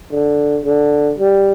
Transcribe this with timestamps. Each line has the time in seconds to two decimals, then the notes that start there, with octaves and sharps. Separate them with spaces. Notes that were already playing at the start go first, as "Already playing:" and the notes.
0.11 D3
0.65 D3
1.18 G3